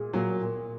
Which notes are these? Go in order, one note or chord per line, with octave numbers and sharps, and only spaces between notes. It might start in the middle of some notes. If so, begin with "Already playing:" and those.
Already playing: A#2 G#3 G#4
A#2 F#3 A#3
A#2